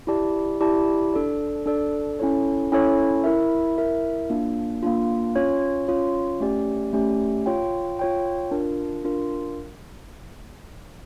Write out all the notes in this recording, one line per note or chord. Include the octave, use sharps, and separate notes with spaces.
E4 G4 D5 A5
E4 G4 D5 A5
D4 A4 D5
D4 A4 D5
C#4 E4 A4 C#5
C#4 E4 A4 C#5
E4 A#4 E5
E4 A#4 E5
A#3 D4 F4
A#3 D4 F4
C#4 F4 C#5
C#4 F4 C#5
A3 C#4 G4 D5
A3 C#4 G4 D5
F4 C#5 G5
F4 C#5 G5
D4 F4 A#4
D4 F4 A#4